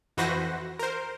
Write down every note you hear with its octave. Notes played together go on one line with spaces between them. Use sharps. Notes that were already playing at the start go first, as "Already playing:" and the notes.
F2 E3 F#4 B4 C5 A#6
A#4 C5